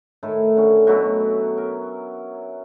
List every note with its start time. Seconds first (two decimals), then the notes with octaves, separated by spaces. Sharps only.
0.23 A2 D#3 E4 A4
0.56 D3 C#4
0.87 B2 F#3 A3 E4
1.58 A#4